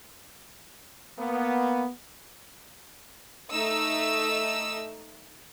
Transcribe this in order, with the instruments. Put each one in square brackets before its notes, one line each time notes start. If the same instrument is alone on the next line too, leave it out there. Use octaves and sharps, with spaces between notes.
[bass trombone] A#3 [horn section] B3
[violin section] A3 D#4 E6